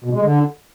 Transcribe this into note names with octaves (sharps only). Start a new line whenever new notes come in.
B2
G#3
D3